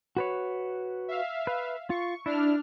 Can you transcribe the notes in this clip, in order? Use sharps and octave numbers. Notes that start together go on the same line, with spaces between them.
F#4 B4 C#5
E5 F5
B4
F4 C#6
D4 E4 F6